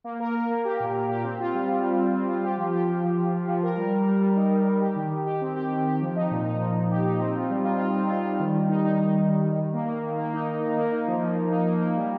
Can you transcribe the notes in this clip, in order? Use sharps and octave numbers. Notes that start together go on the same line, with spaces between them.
A#3
A#4
A#4
A#3
G4
A#2
A#2
G4
C4
F4
G3
G3
G3
C4
C4
F4
G4
F3
G4
F3
F3
F3
F3
F3
A#4
G3
G3
G3
G3
D#4
G3
G3
G4
D#3
D#3
G4
C4
G4
D#3
G4
F3
D#4
A#2
D#4
F3
A#2
G4
D#4
C4
F4
G3
F4
F4
C4
F4
G3
D#3
D#3
D#4
D#4
D#4
D#3
D#3
D#3
D#3
A#3
A#3
D#3
A#3
D#4
D#3
D#4
A#3
D#4
F3
F3
F3
D#4
A#3
A#3
G3